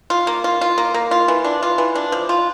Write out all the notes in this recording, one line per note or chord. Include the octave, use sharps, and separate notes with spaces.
F4
A#3
F4
F4
A#3
A#3
F4
E3
D4
F4
E3
D4
F3
F4